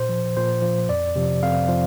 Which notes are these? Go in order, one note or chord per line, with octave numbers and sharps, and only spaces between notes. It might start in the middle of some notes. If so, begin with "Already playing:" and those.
Already playing: A#2 C5
F3
A#2 C5
F3
F2 D5
C3 F3
F2 F5
F3